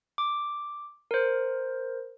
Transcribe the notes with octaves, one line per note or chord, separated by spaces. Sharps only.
D6
A#4 C5